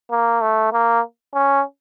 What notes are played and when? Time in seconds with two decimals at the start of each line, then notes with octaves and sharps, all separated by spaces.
0.11 A#3
0.41 A3
0.73 A#3
1.34 C#4